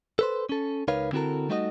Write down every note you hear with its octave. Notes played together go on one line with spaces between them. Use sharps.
A4 B4 C5
C#4 A4
C#2 D#4 A#4 B4 C#5 F5
D3 C4 E4 F#4 A4 A#4
G3 A3 D#4 F#4 B4 D#5